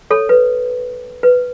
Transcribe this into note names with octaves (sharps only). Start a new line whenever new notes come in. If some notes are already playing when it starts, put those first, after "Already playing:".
A4 C#5
B4
B4